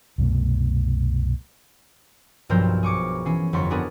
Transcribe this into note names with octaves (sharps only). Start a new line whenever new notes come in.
C2 F#2 B2 A3
B1 G2 F3 A#4 C5 E6
G#4 C#6 D6 C#7
E3 C#4 C7
G1 F2 C#5 C6 C#6 B6
B3 D4 F#4 G#4 A#4 B4